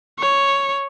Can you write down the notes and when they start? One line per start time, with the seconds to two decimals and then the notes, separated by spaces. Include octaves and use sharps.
0.19 C#5